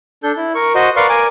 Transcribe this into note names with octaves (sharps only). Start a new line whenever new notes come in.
D4 A4 G6
E4
A#4 C#6
F#4 C5 D#5
A#4 B4 D5 F5 C6 C#6
A#4 G#5 D6